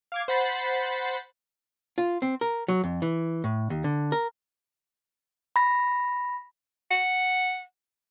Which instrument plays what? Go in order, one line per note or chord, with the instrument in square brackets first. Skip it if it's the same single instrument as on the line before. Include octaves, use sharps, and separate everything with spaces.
[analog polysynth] F5 D6 G#6
C5 F#5 B5 A6 B6 C7
[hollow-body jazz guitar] F4
C4
A#4
F#3
F2
E3
A2
D#2
D3
A#4
[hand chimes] B5 A#6
[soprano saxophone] F#5